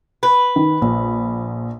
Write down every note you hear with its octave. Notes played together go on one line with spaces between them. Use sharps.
B4
D#3
A#1